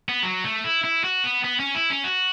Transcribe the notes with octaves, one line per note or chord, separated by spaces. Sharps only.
B3
F#3
A3
E4
E4
F#4
B3
B3
C#4
E4
C#4
F#4